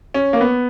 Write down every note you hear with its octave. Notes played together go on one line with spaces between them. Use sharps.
C#4
A#3
B3